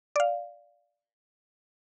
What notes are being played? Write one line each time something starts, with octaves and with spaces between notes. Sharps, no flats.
D5 F5